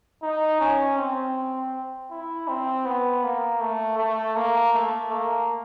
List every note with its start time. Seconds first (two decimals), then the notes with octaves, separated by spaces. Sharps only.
0.22 D#4
0.60 C#4
0.98 C4
2.11 E4
2.48 C4
2.86 B3
3.24 A#3
3.61 A3
3.98 A3
4.36 A#3
4.74 A3
5.11 A#3